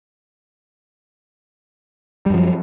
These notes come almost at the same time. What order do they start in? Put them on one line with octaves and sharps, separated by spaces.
G3 F#2 F3